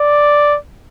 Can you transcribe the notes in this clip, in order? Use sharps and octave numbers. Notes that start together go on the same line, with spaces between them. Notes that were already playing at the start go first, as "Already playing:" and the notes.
Already playing: D5